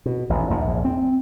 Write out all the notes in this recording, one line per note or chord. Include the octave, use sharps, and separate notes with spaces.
B2
A1 D#2
A#1 E2 G#2
C4